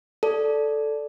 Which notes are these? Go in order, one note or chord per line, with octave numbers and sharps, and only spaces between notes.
A4 D5